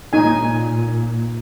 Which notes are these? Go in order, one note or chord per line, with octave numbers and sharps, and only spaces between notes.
A#2 D#4 G#5